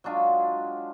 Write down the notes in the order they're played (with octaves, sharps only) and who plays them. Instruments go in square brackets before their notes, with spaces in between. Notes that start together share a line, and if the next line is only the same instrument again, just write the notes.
[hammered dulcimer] F#3 G#3 D4 F4